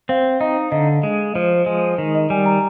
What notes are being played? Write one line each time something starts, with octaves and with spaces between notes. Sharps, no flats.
C4 F5
D#4 D#5
D3 D#5
G#3
F3
G#3
D#3
D#5
G3 G#5
A#5